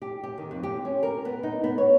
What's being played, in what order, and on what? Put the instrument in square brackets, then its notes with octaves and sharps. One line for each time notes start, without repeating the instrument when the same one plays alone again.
[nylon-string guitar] G4
G4
D#3
F2
G4
C#4
A#4
B3
D#4
B3
C#5